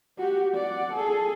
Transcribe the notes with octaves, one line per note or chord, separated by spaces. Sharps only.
F#4 G4
D5 F#5
G#4 A4